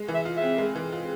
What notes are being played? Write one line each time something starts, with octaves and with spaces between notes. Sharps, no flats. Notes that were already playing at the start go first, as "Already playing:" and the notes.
Already playing: G#3
E3
E5
F4
C4 E5
G#3
E3
F4